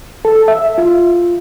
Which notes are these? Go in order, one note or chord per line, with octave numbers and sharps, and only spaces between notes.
A4
E5
F4